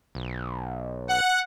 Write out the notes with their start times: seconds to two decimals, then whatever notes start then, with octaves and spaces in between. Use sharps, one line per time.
0.15 B1
1.08 F#5